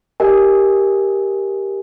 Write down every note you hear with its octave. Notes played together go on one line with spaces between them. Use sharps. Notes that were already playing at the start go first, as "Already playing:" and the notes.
G4 A#4 D#5 G#5